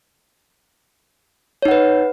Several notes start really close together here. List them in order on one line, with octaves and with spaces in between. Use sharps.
C#5 D#4 F#5 B4